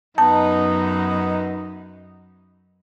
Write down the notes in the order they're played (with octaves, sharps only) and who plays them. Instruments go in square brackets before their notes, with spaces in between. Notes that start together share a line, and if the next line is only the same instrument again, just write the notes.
[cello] F#2 [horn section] B3 D#4 [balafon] A5